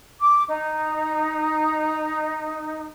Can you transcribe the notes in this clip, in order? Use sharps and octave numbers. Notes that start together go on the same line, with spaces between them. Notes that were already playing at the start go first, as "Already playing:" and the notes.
D6
D#4